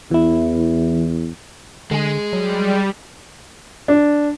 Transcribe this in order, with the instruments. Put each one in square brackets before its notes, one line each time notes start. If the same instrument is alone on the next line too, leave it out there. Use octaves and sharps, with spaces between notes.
[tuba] E2 [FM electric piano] E3 E4
[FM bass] D3 [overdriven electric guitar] G#3 G#4
[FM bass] F#3 [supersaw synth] G3
[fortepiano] D4